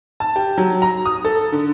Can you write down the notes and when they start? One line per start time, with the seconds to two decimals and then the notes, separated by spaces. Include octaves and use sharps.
0.20 A5
0.36 G4
0.58 F#3
0.82 A#5
1.06 D#6
1.25 A4
1.52 D3